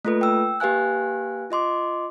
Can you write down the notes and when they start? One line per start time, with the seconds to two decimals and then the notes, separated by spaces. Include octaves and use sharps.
0.05 A3 A#3 F4 A4 B4
0.21 G5 E6
0.60 A#3 G4 B4 F5 G#5 F#6
1.51 F4 D#5 C6 D6